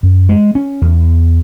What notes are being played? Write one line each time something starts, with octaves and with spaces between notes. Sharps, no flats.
F#2
G#3
C#4
E2